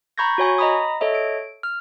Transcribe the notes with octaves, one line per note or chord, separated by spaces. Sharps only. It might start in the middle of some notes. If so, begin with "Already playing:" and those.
A#5 B5 C#6 G6 G#6 A#6
F#4 C#5 G#5 C#6
D#5 A#5 B5 D#6
A4 C#5 D#5 E5
D7
F6